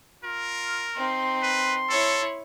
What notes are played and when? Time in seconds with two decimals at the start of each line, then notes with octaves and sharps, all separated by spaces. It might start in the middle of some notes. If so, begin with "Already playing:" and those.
0.24 F4 A#4
0.96 C4 D#4 C6
1.42 B4
1.90 E4 A4 C#5